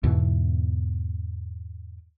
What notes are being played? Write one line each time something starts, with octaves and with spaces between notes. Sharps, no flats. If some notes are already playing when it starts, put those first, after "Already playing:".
E2 G#2 B2 E3